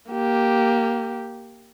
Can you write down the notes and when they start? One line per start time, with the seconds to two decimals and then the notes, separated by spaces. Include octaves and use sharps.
0.11 A#3 G4